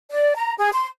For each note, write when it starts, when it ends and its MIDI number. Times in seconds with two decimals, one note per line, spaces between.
0.10 0.33 74
0.36 0.54 82
0.57 0.69 68
0.73 0.88 84